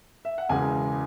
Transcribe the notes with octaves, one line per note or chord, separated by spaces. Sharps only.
E5
F#5
E1 E2 C#3 G#3 G#5